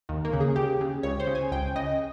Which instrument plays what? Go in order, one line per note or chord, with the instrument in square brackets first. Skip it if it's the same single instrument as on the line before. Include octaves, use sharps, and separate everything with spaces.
[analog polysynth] D#2
A#3
C#3
G#4
C#2 G4
C#3
C#2 C#5
C5
C#3
G#5
C#2 G5
C#3 D#5